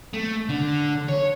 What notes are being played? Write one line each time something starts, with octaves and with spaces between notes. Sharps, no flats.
A3
D3
C#5